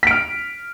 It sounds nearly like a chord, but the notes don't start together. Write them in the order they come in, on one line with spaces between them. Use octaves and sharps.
B6 D7 F6